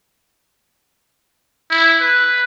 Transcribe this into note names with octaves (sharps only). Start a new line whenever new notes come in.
E4
B4